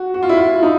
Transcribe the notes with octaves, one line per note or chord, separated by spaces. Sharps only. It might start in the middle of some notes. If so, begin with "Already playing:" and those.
Already playing: F#4
F#4
F4
E4
F4
D#4